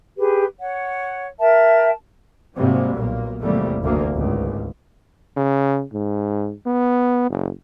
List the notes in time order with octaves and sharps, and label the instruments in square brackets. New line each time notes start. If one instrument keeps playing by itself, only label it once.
[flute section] G4 G#4 B4
C#5 F#5
A#4 E5 G5 A5
[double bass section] G#2 C3 F#3 G3 A#3
B1 A#2 A#3
G#1 E2 C3 G3 A3 A#3
F#1 D2 A#3
G#1 C#2
[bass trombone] C#3
G#2
B3
F#1